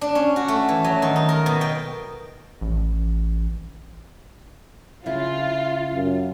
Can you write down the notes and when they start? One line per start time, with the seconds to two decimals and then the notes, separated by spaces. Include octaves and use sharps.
0.01 D4
0.15 C#4
0.36 F#4
0.48 A3
0.68 E3
0.84 F#3
1.02 D#3
1.16 D#4
1.29 A#4
1.46 B2
1.61 G5
2.61 A1
5.06 C#3 E4 F4
5.94 F#2